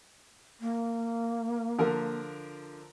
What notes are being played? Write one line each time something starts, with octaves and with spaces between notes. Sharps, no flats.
A#3
D3 F3 A#4